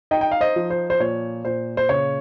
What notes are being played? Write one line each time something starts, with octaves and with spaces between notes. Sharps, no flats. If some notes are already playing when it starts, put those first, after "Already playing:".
D#4 D#5 G5
G5
F5
C5 D#5
F3
C5
C5
A#2 C#5
A#2 C5
C5
C#3 C#5